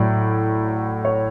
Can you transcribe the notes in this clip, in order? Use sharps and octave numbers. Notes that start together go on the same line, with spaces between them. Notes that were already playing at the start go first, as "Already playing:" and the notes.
Already playing: A2 F#3 D5
C#5